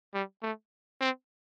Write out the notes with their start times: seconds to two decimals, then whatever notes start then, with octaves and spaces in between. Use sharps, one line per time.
0.14 G3
0.43 A3
1.01 C4